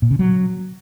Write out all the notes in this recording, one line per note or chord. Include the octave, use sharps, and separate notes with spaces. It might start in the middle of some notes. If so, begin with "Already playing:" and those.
A#2
C#3
F#3